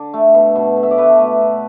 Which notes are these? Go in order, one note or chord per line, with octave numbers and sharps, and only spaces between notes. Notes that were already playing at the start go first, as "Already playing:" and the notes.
Already playing: D3 D5
A3
B2
B2
A3
E5
D5
A3 B4
A3
B2